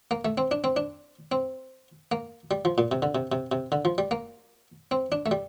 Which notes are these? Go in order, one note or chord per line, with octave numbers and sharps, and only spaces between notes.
A#3
A3
C4
D4
C4
D4
C4
A#3
G3
F3
A#2
C3
D3
C3
C3
C3
D3
F3
G3
A#3
C4
D4
A3
G3